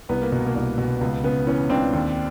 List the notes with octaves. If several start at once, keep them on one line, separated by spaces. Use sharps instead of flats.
C2 B3
A#3
B2
A#3
C2
B2
C#2 B3
C#3 B3
E3 B3 C#4
C#2 C4 D4
D#2